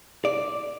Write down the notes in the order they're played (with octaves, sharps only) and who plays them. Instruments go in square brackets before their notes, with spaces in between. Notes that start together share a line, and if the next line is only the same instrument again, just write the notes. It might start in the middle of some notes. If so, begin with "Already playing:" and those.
[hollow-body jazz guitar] D5